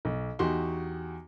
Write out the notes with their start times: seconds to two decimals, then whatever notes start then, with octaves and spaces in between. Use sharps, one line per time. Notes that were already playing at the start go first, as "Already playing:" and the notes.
0.05 B1
0.39 E2 D#4 F#4 G4 C6